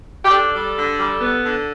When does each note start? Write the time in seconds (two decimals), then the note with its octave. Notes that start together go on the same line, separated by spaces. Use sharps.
0.24 G4
0.30 D4 A4
0.53 G3
0.76 D3
0.98 G3
1.20 B3
1.44 D3